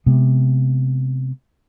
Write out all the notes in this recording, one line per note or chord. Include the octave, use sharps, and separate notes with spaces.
C3 G#3 B3